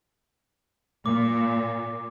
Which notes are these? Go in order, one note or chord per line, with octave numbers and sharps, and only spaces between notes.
A#2 D6